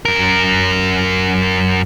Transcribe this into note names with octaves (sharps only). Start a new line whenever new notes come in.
F#2 A#4